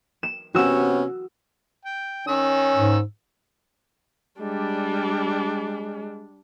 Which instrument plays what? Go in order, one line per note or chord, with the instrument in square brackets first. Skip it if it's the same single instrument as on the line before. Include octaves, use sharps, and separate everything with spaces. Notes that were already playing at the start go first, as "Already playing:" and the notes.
[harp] E7
[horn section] C3 B3 C#4 [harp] F#4 E6
[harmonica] G5
[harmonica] D#3 E6 [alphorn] C#4
[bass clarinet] G#2
[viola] G3 D4 [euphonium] G#3